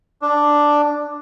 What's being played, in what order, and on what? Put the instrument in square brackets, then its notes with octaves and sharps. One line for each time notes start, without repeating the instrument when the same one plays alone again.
[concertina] D4